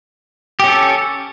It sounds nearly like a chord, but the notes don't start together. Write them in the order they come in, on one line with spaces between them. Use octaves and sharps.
G4 C#4 A4